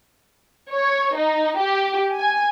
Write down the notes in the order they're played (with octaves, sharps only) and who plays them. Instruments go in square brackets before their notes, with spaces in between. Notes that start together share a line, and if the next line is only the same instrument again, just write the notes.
[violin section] C#5
D#4
G4
G#5